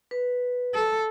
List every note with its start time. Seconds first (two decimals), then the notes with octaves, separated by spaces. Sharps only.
0.11 B4
0.74 A4